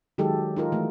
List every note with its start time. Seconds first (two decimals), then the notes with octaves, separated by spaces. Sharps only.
0.18 D#3 F#3 G#3 G4 A4
0.56 D#4 F4 A#4
0.72 E3 A3